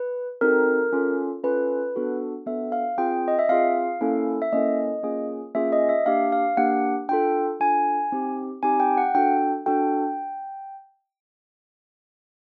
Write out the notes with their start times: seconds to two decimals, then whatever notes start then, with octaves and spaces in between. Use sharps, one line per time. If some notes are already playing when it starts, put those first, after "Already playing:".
Already playing: B4
0.41 C4 D#4 F#4 A4 A#4
0.93 C#4 F4 A4
1.44 C#4 F4 A4 B4
1.96 B3 D4 F#4 A4
2.46 B3 D4 F#4 A4 E5
2.72 F5
2.98 C4 F4 G#4 G5
3.28 D#5
3.39 E5
3.49 C4 F4 G#4 F5
4.01 A#3 C#4 E4 A4
4.42 E5
4.52 A#3 C#4 E4 A4 D#5
5.03 A#3 C#4 F4 G#4
5.55 A#3 C#4 F4 G#4 E5
5.73 D#5
5.89 E5
6.06 A#3 D4 G4 F5
6.32 F5
6.57 A#3 D4 G4 F#5
7.09 D4 F4 A4 G5
7.60 D4 F4 A4 G#5
8.12 C4 D#4 G4
8.63 C4 D#4 G4 G#5
8.80 G5
8.97 F#5
9.15 D4 F#4 A4 G5
9.66 D4 F#4 A4 G5